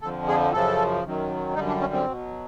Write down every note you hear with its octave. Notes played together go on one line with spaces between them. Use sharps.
F2 D3 F3 A4
G#4
F#2 C#3 F3 A4
F#2 D#3 F#3
F#2 D3 G3 D#4
D4
C#4
C4
B2 F#3